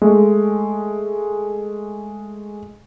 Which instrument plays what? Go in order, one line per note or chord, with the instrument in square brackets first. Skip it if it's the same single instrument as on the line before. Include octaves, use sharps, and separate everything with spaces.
[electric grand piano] G#3 A3